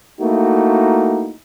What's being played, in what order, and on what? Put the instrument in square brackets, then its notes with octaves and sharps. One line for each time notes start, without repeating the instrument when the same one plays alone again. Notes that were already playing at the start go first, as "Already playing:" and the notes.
[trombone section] A3 A#3 D#4 E4 F#4